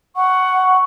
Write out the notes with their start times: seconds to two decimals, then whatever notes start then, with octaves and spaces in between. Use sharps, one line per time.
0.16 F#5 C#6